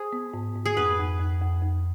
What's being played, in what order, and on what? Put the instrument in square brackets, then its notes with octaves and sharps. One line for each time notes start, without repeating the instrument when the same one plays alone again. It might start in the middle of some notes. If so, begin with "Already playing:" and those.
Already playing: [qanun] G#4 C5
[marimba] B3
G#2
G#2
[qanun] G#4
[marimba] F2 [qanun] B4
[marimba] F2
F2
F2
F2